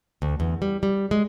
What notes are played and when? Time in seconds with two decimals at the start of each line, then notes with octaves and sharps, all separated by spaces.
0.22 D2
0.40 E2
0.62 G3
0.83 G3
1.11 G#3